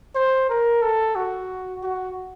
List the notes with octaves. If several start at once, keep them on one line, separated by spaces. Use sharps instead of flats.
C5
A#4
A4
F#4
F#4